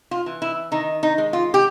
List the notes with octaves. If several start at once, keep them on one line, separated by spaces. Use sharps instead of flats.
F4
E3
E4
D#3 D#4
D#4
G#3
F4
G4